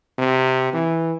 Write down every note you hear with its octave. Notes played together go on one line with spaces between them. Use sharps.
C3
E3